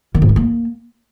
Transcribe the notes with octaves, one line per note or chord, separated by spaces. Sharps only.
D#3
G#2
A3
A#3